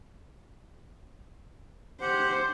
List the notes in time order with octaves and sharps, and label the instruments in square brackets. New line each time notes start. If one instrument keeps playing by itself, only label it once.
[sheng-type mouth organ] G4 F#5 [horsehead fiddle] C5